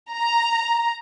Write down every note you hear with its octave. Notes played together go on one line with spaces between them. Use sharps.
A#5